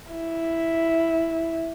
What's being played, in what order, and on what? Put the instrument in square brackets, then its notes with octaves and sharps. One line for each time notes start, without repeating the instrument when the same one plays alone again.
[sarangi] E4